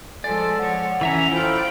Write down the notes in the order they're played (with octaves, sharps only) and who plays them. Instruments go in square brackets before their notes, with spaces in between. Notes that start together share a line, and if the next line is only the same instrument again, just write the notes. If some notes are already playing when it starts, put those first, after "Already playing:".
[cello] F3 G#3 [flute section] A4 [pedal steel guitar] D5 [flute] G#5
[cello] F3 C#5 [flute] F#5
[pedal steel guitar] E3 E5 A#5 [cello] C#4 E4 [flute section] G#5
[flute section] F4 B5 [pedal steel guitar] A4 [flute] C5 [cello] D5 G5